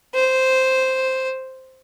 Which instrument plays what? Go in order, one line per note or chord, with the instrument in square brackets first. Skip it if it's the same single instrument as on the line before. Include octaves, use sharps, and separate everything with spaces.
[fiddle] C5